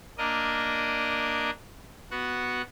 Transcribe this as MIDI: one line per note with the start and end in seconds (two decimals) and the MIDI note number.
0.18 1.51 58
0.18 1.51 62
0.18 1.51 70
0.18 1.51 75
2.11 2.62 59
2.11 2.62 66
2.11 2.62 78